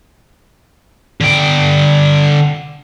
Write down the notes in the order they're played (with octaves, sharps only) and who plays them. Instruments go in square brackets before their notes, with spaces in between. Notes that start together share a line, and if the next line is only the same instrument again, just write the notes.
[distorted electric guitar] D3 G5